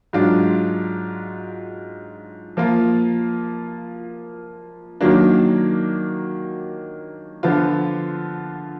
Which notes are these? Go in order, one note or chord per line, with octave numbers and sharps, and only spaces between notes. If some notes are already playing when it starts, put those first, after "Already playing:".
G#2 F#3 D4 F4
F3 A#3 F4
D#3 F#3 A#3 D4
D3 F3 B3 F4